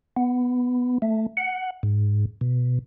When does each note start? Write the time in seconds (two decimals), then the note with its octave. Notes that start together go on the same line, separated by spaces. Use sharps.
0.16 B3
1.02 A3
1.37 F#5
1.83 G#2
2.41 B2